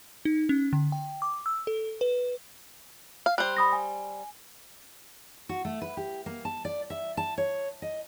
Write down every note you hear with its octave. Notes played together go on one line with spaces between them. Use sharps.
D#4
C#4
D3
G5
D6
E6
A4
B4
F5
G3 C5 F#6
B5 D#6 A#6
G#5
F#4
A3
B4
G4
A#3
A5
D5
E5
A5
C#5
D#5